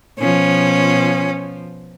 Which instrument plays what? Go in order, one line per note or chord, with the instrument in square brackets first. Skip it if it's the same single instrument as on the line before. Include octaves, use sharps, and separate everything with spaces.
[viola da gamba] B2 F3 [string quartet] C#4